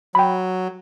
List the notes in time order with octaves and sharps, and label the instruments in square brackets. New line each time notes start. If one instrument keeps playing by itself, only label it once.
[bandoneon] F#3 [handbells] G5 B5